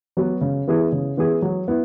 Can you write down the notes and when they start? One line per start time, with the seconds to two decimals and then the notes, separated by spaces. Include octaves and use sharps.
0.17 F#3 B3 F#4 B4
0.41 C#3
0.67 E3 B3 E4 G#4
0.92 C#3
1.17 E3 B3 E4 G#4
1.42 F#3
1.68 B3 E4